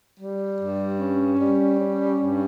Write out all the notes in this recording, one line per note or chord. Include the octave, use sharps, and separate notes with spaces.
G3
G2
C#4
G3
C#4
G2